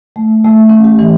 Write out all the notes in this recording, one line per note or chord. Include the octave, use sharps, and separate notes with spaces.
A3
A3
C#4
G4
E3